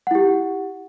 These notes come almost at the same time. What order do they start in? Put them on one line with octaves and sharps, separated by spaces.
F#5 E4 G4